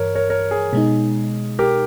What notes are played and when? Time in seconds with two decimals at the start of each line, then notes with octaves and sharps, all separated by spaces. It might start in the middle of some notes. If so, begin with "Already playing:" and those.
Already playing: G2 E3 A#4 C#5
0.15 A#4 C#5
0.30 A#4 C#5
0.51 G#4
0.73 B2 G#3 D#4
1.59 G4 A#4